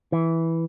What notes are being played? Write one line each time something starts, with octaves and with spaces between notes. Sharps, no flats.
E3